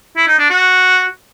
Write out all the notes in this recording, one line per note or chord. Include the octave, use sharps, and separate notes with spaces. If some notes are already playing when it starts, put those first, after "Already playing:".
E4
D#4
D4
F#4